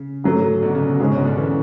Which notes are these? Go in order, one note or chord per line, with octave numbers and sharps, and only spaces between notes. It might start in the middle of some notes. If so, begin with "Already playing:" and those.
Already playing: C#3
G#2 F#3 A3
B2 D3
C#3
B2
G#2 C#3 G#3 C#4
B2 D3
B2 D3
C#3 E3